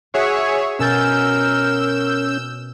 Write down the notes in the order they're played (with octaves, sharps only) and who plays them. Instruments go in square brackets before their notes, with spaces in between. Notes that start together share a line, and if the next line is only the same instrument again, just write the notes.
[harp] F#4 [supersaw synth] G#4 C#5 E5 [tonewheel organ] C#6
[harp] B2 G#5 A6 [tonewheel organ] C#4 [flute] A#4 [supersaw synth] E6 G6